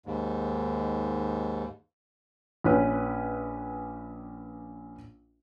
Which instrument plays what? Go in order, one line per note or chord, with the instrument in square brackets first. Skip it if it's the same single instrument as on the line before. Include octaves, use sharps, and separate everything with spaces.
[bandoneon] D#2 G#2
[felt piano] A#1 C#4 B4